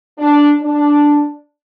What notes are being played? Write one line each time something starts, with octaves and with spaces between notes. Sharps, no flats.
D4
D4